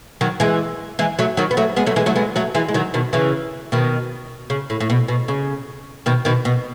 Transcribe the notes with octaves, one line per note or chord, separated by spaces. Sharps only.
D#3 F#3
E3 G#3
E3 G#3
F#3 A3
D#3 F#3
B3
F#3 A3
G#3 B3
F#3 A3
E3 G#3
F#3 A3
G#3 B3
F#3 A3
E3 G#3
G#3
D#3 F#3
B2 D#3
C#3 E3
B2 D#3
C#3
A2
A2
B2
B2
C#3
B2 D#3
B2 D#3
B2